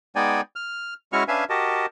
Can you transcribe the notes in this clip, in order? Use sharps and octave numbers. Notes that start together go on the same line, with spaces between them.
G#3 B3 D#4 D5 G5 G#5
F6
G#3 C#4 E4 F#4 C#6 F6
C#4 D4 B4 E5 F5 G#5
F#4 G4 A#4 D#5 A5